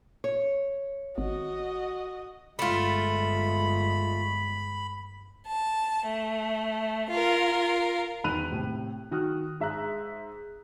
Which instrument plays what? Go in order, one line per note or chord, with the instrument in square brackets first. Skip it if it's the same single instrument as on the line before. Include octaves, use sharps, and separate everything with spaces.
[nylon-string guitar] C#5
[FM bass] G#1 [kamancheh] F#4 D#5
[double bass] G1 G#3 [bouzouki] A3 F4 [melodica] B5
[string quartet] A5
A3
F4 A#4
[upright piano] E1 D#3 B5 F#6 D#7 F7
A2 C3
D#3 F#4 D#6 F6 F#6
G#2 E5 A#5 F#6